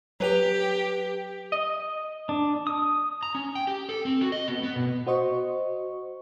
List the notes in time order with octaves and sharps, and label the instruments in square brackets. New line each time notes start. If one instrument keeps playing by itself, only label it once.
[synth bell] F#3 B4 F7 [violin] G4
[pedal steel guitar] D#5
D4
D#6
[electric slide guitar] A#5
C#4
G5
G4
A4
C4
F#4
D#5
B3
B3
B2
[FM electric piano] F#4 C5 D#5 C#6